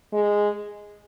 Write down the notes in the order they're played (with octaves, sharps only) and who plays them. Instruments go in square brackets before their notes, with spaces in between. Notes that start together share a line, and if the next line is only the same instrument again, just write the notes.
[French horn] G#3